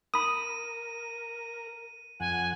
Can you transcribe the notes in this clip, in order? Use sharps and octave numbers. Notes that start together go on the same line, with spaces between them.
A#4 B5 D#6 D#7
F2 F#5 G#5